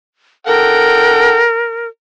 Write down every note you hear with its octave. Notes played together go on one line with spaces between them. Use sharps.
A4 A#4 F#5 G5